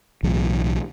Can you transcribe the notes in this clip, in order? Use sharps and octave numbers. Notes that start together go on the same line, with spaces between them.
B1 A2 E3 F#3